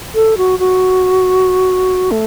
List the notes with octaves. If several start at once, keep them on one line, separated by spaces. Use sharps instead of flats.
A4
F#4
F#4
A3